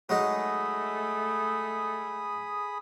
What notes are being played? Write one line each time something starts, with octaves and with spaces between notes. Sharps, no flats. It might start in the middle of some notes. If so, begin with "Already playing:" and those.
F#3 G#3 A3 D#4 G#4 B5 D#6